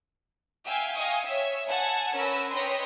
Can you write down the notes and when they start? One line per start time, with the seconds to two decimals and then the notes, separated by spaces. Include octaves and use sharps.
0.65 E5 F5 G5 G#5
0.95 D#5 F5 G5 G#5 C#6 D#6
1.25 C#5 E5
1.68 F#5 G#5 A5 G#6
2.14 C#4 A#4 B4 E6
2.52 B4 C#5 D#5 G5 C6